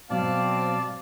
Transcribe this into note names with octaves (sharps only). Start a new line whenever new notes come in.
B2 F#3 C4 D5 F5 A5